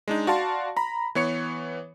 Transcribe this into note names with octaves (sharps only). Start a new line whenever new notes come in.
G#3 D4 D#4
F#4 D5 F5 A5 C6
A#5 B5
E3 B3 C#5 C#6 C#7